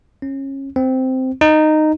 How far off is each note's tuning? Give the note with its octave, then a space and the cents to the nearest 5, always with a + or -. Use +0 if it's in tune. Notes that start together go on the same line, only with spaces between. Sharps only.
C#4 -25
C4 -10
D#4 -10